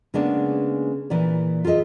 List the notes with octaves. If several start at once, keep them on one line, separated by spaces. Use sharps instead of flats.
C#3 G#3 A#3 B3 C#4 D4
A#2 E3 B4 D5
F4 G#4 A4 D#5 E5